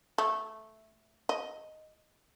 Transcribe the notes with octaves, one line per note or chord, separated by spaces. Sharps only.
A3
D#5